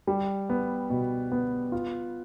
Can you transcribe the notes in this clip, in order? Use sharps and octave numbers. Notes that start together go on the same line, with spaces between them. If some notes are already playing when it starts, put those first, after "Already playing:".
G3
B3
B2
B3
F4